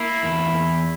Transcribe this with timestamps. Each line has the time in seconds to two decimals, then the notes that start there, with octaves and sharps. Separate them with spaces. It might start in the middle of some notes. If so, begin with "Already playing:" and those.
Already playing: A#3 E4
0.23 E2